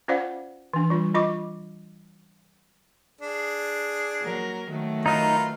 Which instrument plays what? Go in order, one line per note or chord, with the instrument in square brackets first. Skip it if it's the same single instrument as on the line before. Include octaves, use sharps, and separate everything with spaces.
[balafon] C#4 F4 C5 D5 F5 F#5
E3 D4
G3 F4
F4 D#5 C#6 D6
[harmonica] D4 G#4
[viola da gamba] F#3 A#3 A#4
D#3 F#3 A3
[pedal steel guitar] D#4 D#5 [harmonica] F4 A#4 B4